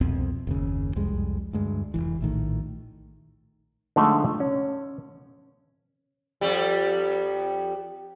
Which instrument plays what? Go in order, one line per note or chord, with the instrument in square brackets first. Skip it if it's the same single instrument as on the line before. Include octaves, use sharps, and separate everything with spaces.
[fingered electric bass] C2 F2 B2 C4
F#1 D#2 C#3
C2 F2 G3 G#3
D2 G2 G#3
F1 C2 E3
A#1 A2 D#3
[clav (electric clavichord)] D3 F3 G#3 A3 D#4
C#4
[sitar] F2 G3